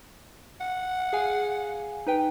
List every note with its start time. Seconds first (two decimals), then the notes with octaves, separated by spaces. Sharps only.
0.60 F#5
1.13 G#4 F5 G#5
2.07 D#4 B4 G5